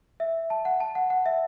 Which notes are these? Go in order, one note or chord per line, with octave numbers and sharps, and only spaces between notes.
E5
A5
F#5
A5
F#5
F#5
E5